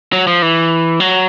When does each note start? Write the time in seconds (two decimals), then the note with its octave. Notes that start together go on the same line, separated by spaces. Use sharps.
0.13 F#3
0.27 F3
0.42 E3
1.00 F#3